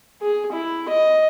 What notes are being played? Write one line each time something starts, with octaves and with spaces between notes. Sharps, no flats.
G#4
E4
D#5